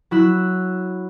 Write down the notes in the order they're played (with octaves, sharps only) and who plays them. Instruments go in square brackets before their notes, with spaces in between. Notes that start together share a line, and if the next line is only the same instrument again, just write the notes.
[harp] F#3 E4 E6 F#6